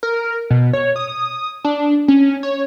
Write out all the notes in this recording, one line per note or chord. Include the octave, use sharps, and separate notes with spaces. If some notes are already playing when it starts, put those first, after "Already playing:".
A#4
B2
C#5
D#6
D4
C#4
C#5